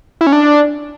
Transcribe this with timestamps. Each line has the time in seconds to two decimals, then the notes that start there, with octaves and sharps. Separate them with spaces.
0.21 E4
0.27 C#4
0.33 D4